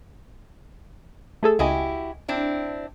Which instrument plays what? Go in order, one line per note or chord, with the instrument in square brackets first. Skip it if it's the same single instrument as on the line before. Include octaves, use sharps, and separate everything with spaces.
[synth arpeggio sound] A3 G#4 A4
[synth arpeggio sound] C#2 D#5 G#5 [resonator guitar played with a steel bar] E4 F#4 G4
[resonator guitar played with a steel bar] C4 D4 E4